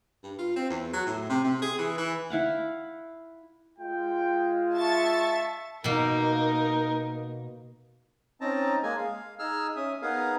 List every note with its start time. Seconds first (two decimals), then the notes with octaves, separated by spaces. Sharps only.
0.23 G2
0.39 F4
0.56 C4
0.70 E2
0.93 F#3
1.06 A2
1.29 C3
1.44 C3
1.62 G#4
1.78 E3
1.98 E3
2.30 E4 F5 F#5
3.78 G#3 F4 G5
4.74 E5 A5 C#6 A6
5.84 B2 A#3 D#4 A#4
8.41 C4 C#4 D#4 A5 A#5
8.83 G#3 A#3 G#4 G#5
8.98 F5
9.39 D#4 G#4 E6 F6
9.76 C#4 E5 D#6
10.02 B3 D#4 G#4 A#4 F5